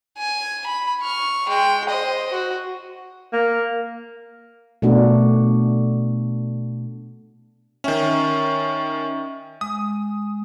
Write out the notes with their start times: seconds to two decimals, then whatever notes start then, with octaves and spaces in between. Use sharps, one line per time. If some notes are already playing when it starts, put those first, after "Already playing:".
0.18 G#5
0.66 B5
1.02 C#6 F6
1.48 G#3 G5
1.89 C5 D#5
2.32 F#4
3.33 A#3
4.82 B2 A3 D4 F#4
7.84 D#3 C#4 E5 G5 C#6
9.61 G#3 D#6